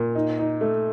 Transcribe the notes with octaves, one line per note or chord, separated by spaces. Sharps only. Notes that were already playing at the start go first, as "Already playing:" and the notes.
Already playing: A#2
D#4
D#4
A3